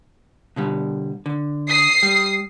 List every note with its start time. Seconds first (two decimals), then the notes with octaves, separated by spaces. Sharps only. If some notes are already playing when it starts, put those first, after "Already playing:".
0.56 B2 D3 G3
1.26 D3
1.68 D#6 C7
2.03 G3